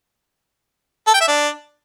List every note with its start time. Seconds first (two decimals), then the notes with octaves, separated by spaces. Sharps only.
1.07 A4
1.14 G5
1.21 E5
1.28 D4